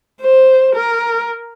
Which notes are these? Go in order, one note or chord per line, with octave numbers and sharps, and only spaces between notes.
C5
A#4